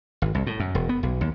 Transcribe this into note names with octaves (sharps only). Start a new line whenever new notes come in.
G#1
C2
A2
F#2
E1
B3
B1
D#2